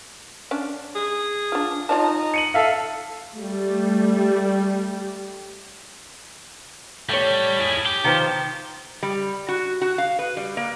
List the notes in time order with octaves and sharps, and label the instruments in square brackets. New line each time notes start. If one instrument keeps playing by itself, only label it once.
[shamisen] C#4 D4
[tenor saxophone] G#4
[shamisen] D4 F4
[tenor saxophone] D#4 [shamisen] F4 C#5 A5
[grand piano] C#7 D#7 F#7
A4 E5 F5
[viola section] G3 A3
[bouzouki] A2 C#5 [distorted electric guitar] G3
[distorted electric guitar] E4 G#4
G4
[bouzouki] D#3 F3 C5
[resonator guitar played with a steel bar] G3
F#4
F#4
F5
B4
G3
A#3